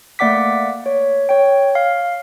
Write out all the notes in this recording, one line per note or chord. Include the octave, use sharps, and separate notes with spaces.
A3 A#3 D5 F#5 D6 B6
C#5
C#5 G5
F5